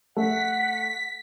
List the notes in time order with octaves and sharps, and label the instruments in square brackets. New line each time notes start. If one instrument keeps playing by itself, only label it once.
[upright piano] A3 [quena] F#5 [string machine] B6